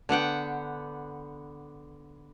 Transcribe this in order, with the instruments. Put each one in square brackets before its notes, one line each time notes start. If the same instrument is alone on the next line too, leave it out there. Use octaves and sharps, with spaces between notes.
[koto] D3 B3 F#5 G5